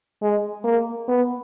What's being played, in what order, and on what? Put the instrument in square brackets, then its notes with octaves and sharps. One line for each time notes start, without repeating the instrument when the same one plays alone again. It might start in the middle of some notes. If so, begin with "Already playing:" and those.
[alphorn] G#3
A#3
B3